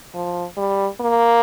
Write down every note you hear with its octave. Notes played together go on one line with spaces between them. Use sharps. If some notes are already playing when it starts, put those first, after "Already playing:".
F3
G3
A#3